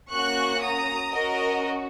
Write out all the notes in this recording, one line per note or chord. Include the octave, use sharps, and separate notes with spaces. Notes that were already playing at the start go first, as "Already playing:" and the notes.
A#3 C#4 F#4 C#6 F#6
A#5 D#6
C#4 F#4 A#4 D#5